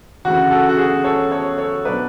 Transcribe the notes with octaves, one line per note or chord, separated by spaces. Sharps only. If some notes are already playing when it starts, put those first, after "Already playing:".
D2 C#3 E3 F#4
F#4 A4
F#4
G#4
A4 C#5
A4 C#5
A4 C#5
B2 F#3 B3 D4 B4 D5